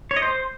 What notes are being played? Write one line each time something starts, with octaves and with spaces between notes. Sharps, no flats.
C#5
D#5
C5